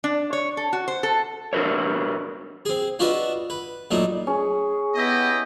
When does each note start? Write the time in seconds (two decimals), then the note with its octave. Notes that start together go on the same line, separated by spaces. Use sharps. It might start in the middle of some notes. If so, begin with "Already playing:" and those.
0.04 D4
0.33 C#5
0.57 A4
0.73 F#4
0.88 C5
1.03 A4
1.53 D4 F#4 A#4 B4 C#5
2.65 C4 G#4
2.99 D4 F4 F#4 B4 D#5 E5
3.50 B4
3.91 A#2 F#3 A3 D4 D#4
4.27 C#4 G#4
4.95 B3 E4 G4 D#5